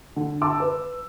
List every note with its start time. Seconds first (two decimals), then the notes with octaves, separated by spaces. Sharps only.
0.16 D3
0.42 A5 D6 E6
0.60 B4